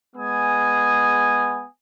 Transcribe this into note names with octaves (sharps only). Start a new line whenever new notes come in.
G#3 B3 G#5 D#6